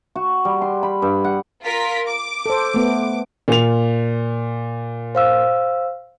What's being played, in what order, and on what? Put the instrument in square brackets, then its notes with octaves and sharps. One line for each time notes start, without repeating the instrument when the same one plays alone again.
[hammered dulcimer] F#4
G3
C6
B5
G2
F#5
[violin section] F4 A#4 B6
D6
[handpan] A4 C5
A3 B3
[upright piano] A#2 F7
[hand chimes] C5 F5 E6